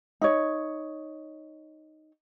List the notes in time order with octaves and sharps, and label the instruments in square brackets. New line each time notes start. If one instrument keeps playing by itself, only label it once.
[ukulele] D#4 C#5